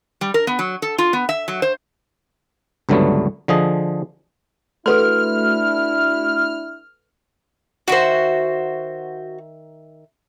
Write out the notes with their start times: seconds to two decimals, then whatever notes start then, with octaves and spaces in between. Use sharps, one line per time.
0.21 G3
0.34 A#4
0.47 B3
0.59 F#3
0.82 A4
0.98 F4
1.13 B3
1.29 E5
1.48 F#3
1.62 C5
2.89 C#2 G2 D3 F#3 A3 B3
3.48 D3 F3 G#4 D#5
4.86 A3 D4 E4 F#4 A4 B4 C6 F6
7.88 D#3 F#4 C5 E5